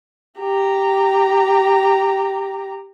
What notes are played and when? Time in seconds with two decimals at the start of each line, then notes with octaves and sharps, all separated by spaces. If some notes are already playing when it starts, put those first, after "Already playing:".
0.40 G4 A#5